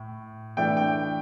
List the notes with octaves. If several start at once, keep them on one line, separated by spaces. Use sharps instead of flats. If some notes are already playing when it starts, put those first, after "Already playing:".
Already playing: A2
E3 A3 D4 G5
G5